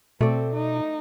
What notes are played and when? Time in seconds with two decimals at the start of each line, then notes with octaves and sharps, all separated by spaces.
0.21 B2 A3 C4 D5
0.54 D#4